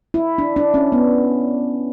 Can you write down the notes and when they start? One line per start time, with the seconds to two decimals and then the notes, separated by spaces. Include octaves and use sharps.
0.14 E4
0.38 D4
0.56 D4
0.74 C#4
0.92 B3